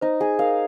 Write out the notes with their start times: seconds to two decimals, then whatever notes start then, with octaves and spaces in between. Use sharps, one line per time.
0.01 D#4 C5
0.20 G#4
0.39 A#4 F5